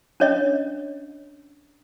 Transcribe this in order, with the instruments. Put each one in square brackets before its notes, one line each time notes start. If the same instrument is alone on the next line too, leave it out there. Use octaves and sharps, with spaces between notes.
[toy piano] C#4 D4 C#5 D#5